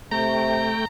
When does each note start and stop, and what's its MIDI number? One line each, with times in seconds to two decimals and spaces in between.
0.11 0.75 48
0.11 0.85 57
0.11 0.85 79
0.11 0.87 82